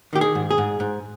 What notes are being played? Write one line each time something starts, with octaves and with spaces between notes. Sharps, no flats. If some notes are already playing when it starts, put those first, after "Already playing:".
D#3 G4
G#4
G#2
G#4
G#2
G#2